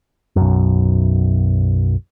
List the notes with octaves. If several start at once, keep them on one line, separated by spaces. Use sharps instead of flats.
B1 F#2